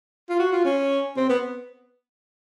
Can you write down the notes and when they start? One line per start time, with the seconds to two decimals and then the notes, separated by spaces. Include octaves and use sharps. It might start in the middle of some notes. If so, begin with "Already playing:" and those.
0.30 F4
0.39 F#4
0.52 F4
0.65 C#4
1.17 C4
1.29 B3